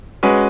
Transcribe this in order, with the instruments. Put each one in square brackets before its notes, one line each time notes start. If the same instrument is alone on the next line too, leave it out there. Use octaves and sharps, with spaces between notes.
[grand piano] G#3 C#4 F#4 B4